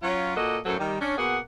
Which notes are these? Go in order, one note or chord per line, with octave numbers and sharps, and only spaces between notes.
F#3 C#4 F4
A#2 A#3 F#4 A4 D#5
F#2 A2 F#3 A4 C5
D#3 G3
C#4 D4
B2 A#3 G#4 F#5